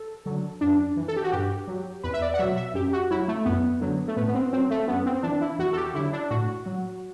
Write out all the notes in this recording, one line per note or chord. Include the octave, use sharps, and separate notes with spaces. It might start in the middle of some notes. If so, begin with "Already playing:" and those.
Already playing: A4
D3 F#3
F#2 D4
E3
A4
G4
F#4
G2 G4
F#3
E2 B4
E5
D5
F#5
B2 F#3 E5
E5
F#2 G4
F#4
F#3 E4
A3
F#2 B3
D3 F#3
A3
A2 B3
B3
C4
F#3 C4
A3
F#2 B3
C4
E3 D4
E4
E2 F#4
A4
G4
D3 F#3 E4
D4
A2 F#4
F#3